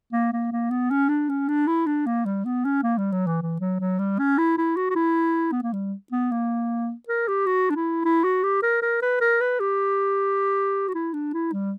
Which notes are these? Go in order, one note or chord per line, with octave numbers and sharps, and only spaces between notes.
A#3
A#3
A#3
B3
C#4
D4
C#4
D4
E4
D4
A#3
G3
B3
C#4
A#3
G3
F#3
E3
E3
F#3
F#3
G3
C#4
E4
E4
F#4
F#4
E4
B3
A#3
G3
B3
A#3
A#4
G4
F#4
D4
E4
E4
F#4
G4
A#4
A#4
B4
A#4
B4
G4
F#4
E4
D4
E4
G3